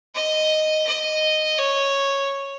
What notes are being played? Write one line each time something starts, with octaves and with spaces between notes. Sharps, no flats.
D#5
D#5
C#5